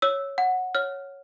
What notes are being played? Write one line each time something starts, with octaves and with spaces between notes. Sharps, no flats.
C#5 E6
F#5
C#5 F6